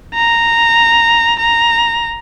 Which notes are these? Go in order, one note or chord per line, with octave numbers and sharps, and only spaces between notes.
A#5
A#5